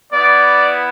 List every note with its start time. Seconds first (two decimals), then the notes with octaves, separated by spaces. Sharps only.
0.10 B3 E4 D5